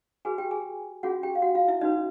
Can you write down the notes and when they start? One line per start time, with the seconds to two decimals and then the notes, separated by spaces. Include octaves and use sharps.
0.25 F#4 G#4 B4 G#5
0.38 G4 G5
0.51 G#4 G#5
1.03 C#4 F4 F#4 G#4 F#5
1.23 G4 G5
1.35 F5
1.42 F#4 F#5
1.55 F4 F5
1.68 E4 E5
1.81 C#4 D#4 F#4 B4 D#5